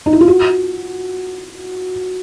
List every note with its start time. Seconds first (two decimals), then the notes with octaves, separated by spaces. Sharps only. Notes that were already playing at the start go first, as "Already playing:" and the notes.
0.06 D#4
0.13 E4
0.21 F4
0.28 F#4